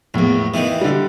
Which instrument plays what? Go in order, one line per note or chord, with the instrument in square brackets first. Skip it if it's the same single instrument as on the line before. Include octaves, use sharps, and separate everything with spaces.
[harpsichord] A#1 E2 [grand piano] A2
[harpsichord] D#2 D#3 E3 [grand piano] E5
[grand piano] D3 G3